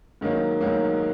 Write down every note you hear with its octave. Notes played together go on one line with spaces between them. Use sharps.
G#2 D#3 F#3 A#3
G#2 D#3 F#3 A#3